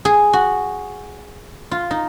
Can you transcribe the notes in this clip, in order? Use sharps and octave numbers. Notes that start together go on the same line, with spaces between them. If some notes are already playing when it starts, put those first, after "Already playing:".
G#4
F#4
F4
D#4